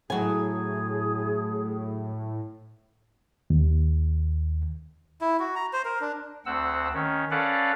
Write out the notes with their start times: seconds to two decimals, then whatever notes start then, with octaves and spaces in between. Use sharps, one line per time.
0.10 A2 F#3 G#4 G#5
3.50 D#2
5.21 E4
5.40 F#4
5.56 A#5
5.73 C5
5.85 A#4
6.01 D4
6.46 D2 C4 F#5 E6
6.94 D#3 C#4
7.31 C#4 A4 B4 D5 F5 F#5